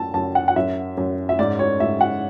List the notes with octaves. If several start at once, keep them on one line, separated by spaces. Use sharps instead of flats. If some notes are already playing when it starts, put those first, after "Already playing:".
Already playing: F#2 A5
F#2 A5
F#5
F#5
F#2 E5
F#2
E5
G#2 D5
C#5
G#2 E5
F#5